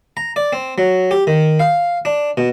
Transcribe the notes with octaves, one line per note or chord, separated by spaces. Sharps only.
A#5
D5
C4
F#3
G4
D#3
F5
D4
B2